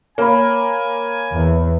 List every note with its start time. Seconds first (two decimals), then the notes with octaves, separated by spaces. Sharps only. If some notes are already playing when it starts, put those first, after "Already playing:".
0.18 A#3 C#5 G#5 B5
1.32 E2